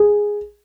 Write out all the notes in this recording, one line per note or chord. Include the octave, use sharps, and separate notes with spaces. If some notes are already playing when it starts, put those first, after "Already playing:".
Already playing: G#4